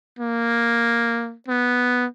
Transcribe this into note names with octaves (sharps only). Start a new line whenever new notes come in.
A#3
B3